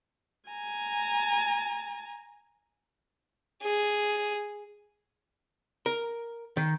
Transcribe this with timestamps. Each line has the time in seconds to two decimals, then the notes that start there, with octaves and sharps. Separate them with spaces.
0.50 G#5 A#5
3.62 G#4
5.86 A#4
6.57 D#3